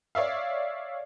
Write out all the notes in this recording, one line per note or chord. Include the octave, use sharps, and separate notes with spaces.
C#5 D5 E5 F5